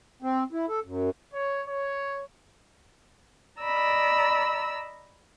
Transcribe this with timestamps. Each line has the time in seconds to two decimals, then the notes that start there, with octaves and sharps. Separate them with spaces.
0.22 C4
0.52 E4
0.68 A4
0.84 F#2
1.33 C#5
1.68 C#5
3.60 D5 D#5 A#5 B5 E6